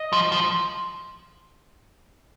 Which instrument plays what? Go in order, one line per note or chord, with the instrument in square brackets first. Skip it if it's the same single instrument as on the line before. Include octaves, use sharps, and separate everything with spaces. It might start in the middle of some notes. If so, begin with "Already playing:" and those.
Already playing: [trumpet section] D#5
[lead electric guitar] F3
F3